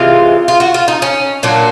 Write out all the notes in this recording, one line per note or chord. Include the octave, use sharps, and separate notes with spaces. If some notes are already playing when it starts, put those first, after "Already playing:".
Already playing: C3 E3 G#3 F4
F4
F#4
F4
D#4
C#4
A#2 F#3 A#3 D4